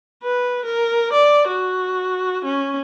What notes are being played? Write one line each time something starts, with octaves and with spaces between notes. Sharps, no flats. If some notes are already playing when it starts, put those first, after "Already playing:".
B4
A#4
D5
F#4
C#4